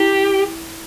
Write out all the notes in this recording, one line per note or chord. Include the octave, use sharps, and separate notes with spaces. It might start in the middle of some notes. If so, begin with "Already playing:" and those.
Already playing: E4 G4